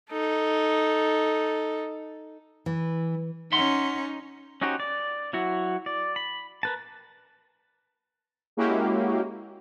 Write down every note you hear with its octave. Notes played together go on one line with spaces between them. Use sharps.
D#4 A4
E3
C#4 D#4 E5 F#5 C6
C#4 D#4 F#4 G4 C5
D5
F#3 E4 F#4
D5
B5
A#4 B4 A5
G#3 A#3 C#4 E4 F#4 G4